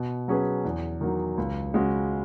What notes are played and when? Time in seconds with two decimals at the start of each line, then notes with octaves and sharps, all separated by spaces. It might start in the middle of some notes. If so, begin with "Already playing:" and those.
Already playing: B2
0.28 F#3 C#4 G#4 B4
0.65 E2
1.01 D#3 F#3
1.38 C#2
1.74 C#3 G#3 C#4 F#4